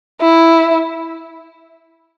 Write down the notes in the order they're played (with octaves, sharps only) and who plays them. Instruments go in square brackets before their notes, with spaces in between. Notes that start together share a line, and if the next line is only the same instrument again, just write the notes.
[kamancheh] E4